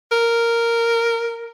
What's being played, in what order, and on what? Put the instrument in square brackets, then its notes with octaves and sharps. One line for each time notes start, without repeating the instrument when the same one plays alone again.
[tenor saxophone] A#4